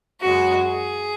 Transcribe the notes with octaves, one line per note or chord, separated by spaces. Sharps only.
F#2 C#3 G#3 F#4
G#4